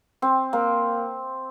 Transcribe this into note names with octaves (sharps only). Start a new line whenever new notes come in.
C4
A#3